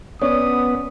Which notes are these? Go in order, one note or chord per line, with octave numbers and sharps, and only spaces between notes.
B3 C#4 C#5 D5 D#6